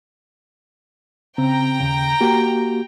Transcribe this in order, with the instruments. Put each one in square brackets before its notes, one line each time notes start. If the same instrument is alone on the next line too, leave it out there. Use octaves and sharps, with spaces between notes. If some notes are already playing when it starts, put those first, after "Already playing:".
[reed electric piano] C#3 C4 [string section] G5 A#5
[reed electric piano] D#2 C#3
A#3 F#4 G4